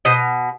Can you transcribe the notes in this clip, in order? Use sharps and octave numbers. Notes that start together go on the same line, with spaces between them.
B2 C5 D#5